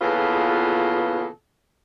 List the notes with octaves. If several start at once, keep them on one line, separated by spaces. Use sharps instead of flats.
E2 A#2 C#3 B3 F4 A4